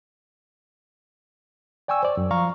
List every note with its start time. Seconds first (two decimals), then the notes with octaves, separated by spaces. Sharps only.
1.88 D5 G5 G#5 C#6 E6
2.03 C5 D5
2.17 F#2
2.31 F3 F5 A#5 C#6